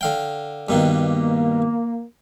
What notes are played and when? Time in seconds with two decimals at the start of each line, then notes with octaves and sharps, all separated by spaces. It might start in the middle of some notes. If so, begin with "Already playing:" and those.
0.01 D3 F5 G5
0.69 G2 B2 D#3 A#3